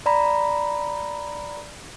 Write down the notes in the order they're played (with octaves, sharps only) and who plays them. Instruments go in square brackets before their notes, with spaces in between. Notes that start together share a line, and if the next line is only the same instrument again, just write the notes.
[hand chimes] D5 A#5 B5